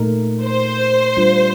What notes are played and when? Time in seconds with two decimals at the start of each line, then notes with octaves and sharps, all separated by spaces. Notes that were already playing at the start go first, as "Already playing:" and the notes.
Already playing: A#2 A3 D#4 A#4
0.42 C5
1.17 G3 D4 F4